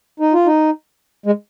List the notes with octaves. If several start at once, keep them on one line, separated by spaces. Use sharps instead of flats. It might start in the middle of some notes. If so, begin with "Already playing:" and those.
D#4
F4
D#4
G#3